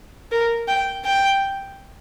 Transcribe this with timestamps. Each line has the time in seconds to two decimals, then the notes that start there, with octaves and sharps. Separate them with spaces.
0.32 A#4
0.68 G5
1.05 G5